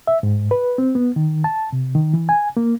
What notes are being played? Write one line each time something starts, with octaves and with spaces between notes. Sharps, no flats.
E5
G#2
B4
C4
B3
D#3
A5
C3
D#3
E3
G#5
A#3